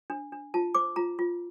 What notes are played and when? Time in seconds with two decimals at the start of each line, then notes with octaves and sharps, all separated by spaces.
0.10 D4
0.32 D4
0.54 F4 A5
0.75 C5 D6
0.96 F4 A#5
1.19 F4